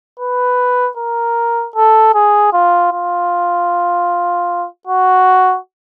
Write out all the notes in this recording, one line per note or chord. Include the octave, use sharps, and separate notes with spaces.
B4
A#4
A4
G#4
F4
F4
F#4